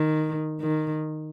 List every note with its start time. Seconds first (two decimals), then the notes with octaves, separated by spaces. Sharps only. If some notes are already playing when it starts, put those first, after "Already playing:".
Already playing: D#3
0.61 D#3